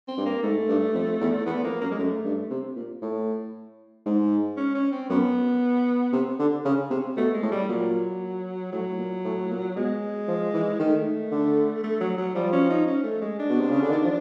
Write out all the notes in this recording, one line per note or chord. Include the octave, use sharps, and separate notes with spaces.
C4
G2
A#3
G#2 A3
G2
F2
E2
E2 B3
F2 A#3
F#2 A#3
G#3
F#2 A3
G2
C3
A#2
A2
G#2
C#4
C#4
C4
F#2 B3
C3
D3
C#3
C3
B2 A3
G#3
A2
G3
A#2 F#3
A2 F#3
A#2
A2
A#2
B2 G#3
F3
E3
D#3 A3
D3
A3
F#3
F#3
F3 G3
C#4
D#4
C#4
A3
G#3
D4
B2
C3
C#3
D3
D#3
F3